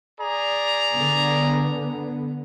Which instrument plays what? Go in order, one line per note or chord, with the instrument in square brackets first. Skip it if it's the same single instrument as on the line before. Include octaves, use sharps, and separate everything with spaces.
[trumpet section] G#4 D5 A#5
[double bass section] D3 B3